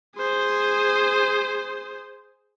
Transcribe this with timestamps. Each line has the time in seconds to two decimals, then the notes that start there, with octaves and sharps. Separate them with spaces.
0.16 G#4 C5